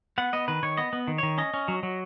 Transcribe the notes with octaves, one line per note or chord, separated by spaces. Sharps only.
B3 F#5
B3 D#5
D#3 B4
D#3 C#5
B3 D#5
B3
D#3
D#3 C#5
C#4 D#5
C#4
F#3
F#3